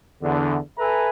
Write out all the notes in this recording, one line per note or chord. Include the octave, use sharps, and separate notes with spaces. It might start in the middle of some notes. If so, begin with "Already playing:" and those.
E2 D3
A4 B4 E5 G#5 A#5